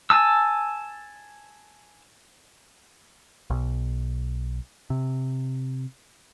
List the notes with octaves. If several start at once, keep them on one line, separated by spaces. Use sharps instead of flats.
G#5 A5 E6
B1
C3